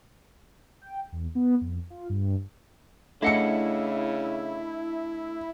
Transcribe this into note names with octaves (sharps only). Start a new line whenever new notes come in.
G5
E2
B3
F2
F4
G2
C#3 A3 D4 E4 D#5 F#5 C#7